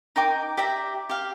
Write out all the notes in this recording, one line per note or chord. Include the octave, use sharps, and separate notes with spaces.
D#4 A#4 G5 D6
G4 D5 E5 A#5
G4 F5